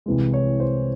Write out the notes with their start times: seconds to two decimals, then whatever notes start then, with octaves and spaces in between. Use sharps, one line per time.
0.06 C2 C3 E3 G#3
0.33 C#5
0.60 C5